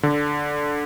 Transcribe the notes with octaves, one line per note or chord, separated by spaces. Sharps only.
D3